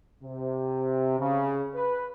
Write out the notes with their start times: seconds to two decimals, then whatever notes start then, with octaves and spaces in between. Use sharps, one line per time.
0.22 C3
1.19 C#3
1.75 B4